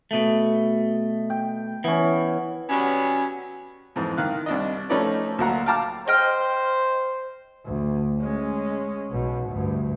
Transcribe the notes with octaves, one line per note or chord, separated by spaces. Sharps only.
B2 A3
G5
E3 B3 C#4
C3 F#3 G3 B3 C#4
F2 G#2 E3
D#3 F5 F#6
C2 D4 D#5
F3 A3 C#4 D#4 B4 D5
D2 F#3 A#3 F#5 A#5
F5 G5 A5 A#5 D6 F6
C5 D#5 G5 F6
D2
G#3 C#4
B1 B2
D2 G2